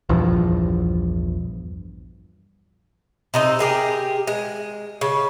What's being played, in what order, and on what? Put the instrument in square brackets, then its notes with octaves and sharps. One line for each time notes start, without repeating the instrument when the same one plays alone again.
[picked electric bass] A#1 E2 G2 F3
[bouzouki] C3 D#4 D#5
G4 G#4 A#4
G#3
C#3